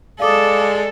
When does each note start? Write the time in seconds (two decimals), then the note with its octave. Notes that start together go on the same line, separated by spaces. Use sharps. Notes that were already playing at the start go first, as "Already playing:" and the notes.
0.20 G#3 A4 D5 F5 D6 D#6